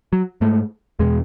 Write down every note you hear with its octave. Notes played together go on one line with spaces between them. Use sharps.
F#3
G#2 A3
E2 B2 G#3